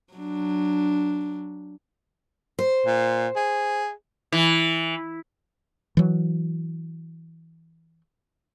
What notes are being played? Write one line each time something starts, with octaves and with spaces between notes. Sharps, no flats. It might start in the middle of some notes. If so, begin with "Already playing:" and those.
F#3 D4
C5
A#2
G#4
E3
E3 F#3